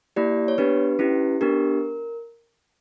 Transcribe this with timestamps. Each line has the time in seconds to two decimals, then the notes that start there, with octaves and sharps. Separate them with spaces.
0.16 A#3 E4 G4 D5
0.48 C#5
0.58 B3 D4 G4 B4
0.99 C#4 E4 G4
1.41 B3 D4 G4 A#4